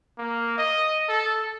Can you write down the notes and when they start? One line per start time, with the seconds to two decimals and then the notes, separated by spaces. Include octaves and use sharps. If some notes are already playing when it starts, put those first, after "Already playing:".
0.18 A#3
0.58 D#5
1.09 A4